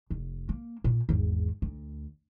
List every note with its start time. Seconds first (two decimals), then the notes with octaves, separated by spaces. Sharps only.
0.11 F1
0.49 A#3
0.84 A#2 B3
1.09 G#1 E2
1.62 D2